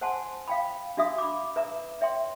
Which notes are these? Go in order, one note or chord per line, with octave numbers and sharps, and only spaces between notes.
C5 F#5 G#5 A5 C6
F5 G5 B5
D4 F#4 E5 F5 D#6
B5 D6
B4 E5 A#5
C#5 E5 G5 C6